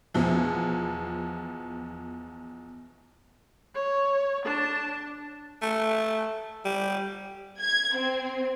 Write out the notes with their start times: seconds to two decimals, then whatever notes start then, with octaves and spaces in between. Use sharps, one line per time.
0.14 E2 B2 F3
3.75 C#5
4.45 D4 A5
5.62 A3
6.65 G3
7.60 G#6
7.95 C4